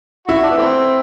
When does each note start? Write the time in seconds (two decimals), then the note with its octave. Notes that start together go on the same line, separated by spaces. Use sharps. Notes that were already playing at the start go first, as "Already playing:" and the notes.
0.28 E4 F#4
0.43 D4
0.51 B3
0.57 E3 A3 C4